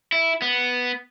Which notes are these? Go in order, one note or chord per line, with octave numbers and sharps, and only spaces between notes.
E4
B3